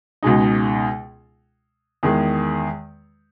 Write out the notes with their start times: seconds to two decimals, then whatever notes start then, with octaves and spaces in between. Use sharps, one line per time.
0.23 C#2 B2 G#3 D#4
2.03 E2 D#3 G#3